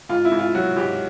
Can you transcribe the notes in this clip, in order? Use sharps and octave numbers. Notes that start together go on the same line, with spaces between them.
G#2 F4
E4
G#2
F4
F#3 F#4
G#2 G4